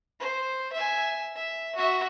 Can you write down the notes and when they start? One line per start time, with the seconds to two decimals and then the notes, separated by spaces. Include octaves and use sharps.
0.20 C5
0.73 E5 G#5
1.36 E5
1.75 F#4 E5